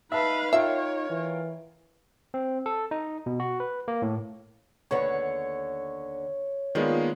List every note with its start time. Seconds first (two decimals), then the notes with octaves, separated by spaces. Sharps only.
0.12 D#4 B4 E5 F5 A5
0.53 F4 A#4 C#5 E5 G5
1.10 E3
2.34 C4
2.66 A4
2.91 D#4
3.26 B2
3.40 F#4
3.60 B4
3.88 A#3
4.02 A2
4.91 D#2 D3 B3 C#5 C#6
6.75 D#3 G#3 A#3 B3 D4 F4